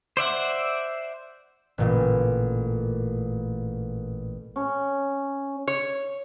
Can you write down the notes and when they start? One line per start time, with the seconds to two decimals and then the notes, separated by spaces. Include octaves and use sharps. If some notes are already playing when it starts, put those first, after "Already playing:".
0.17 C5 D5 E5 F#5
1.78 A1 A#2
4.56 C#4
5.68 C#5